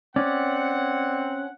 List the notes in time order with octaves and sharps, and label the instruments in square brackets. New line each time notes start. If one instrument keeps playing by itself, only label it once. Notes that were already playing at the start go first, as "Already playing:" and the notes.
[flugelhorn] C4 [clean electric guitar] C#4 [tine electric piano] D5 [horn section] F#5